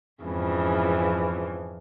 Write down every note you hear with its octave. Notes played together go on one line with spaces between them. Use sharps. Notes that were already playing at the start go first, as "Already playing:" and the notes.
F2 G#2 C#3 E3 F3